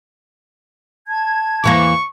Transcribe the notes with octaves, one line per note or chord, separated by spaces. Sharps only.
A5 G#6
E2 E3 A#3 C#6